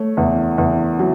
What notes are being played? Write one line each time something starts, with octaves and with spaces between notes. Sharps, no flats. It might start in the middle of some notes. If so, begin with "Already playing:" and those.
Already playing: A3 C#5
E2
E2
F#3